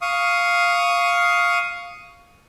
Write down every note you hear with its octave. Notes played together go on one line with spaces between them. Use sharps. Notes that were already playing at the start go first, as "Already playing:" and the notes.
F5 C#6 D#6